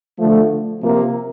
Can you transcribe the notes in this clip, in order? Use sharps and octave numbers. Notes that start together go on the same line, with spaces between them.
D3 F3 A3
C3 F3 A#3